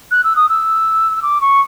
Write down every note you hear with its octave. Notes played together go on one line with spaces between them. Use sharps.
F#6
E6
D#6
E6
D6
C#6